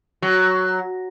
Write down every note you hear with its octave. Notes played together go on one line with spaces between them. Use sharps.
F#3